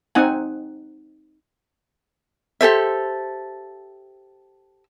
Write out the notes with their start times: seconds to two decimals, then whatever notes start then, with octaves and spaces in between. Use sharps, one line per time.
0.15 C4 D#4 F#5 G#5
2.61 G4 A4 C5 E5